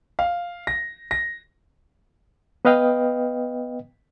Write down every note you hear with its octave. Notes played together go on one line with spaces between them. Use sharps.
F5
A#6
A#6
B3 B4 D#5 F5 G5